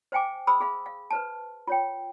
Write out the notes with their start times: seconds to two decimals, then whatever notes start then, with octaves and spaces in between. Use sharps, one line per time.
0.12 C5 F5 G5 G#5 D6
0.47 G#4 C5 B5 D#6 E6
0.61 G#4 F5 B5
0.86 F5
1.11 B4 C5 A5
1.67 F4 C#5 G5